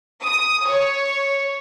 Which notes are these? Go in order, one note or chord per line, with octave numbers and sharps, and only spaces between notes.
D#6
C#5